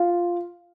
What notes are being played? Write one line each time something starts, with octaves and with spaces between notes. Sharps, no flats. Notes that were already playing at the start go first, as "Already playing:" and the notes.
Already playing: F4